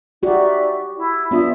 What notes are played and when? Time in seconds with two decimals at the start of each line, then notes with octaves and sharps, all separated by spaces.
0.23 D#4 F#4 G4 D5 E5
0.97 E4
1.31 B3 D4 F4 E5 D#6